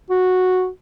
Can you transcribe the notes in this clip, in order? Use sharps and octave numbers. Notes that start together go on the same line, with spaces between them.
F#4